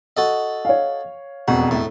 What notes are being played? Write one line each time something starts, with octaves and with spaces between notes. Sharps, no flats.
F#4 A4 D#5
C#5 F5
E1 F2 B2 F#4
A2